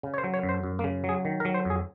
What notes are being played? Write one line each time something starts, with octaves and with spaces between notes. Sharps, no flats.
C#3
C#5
C5
F#3
C#5
F#2
C5
F#2
A#3
C#3
F#3
G#4
D#3
A#4
F#3
C5
F2 G#4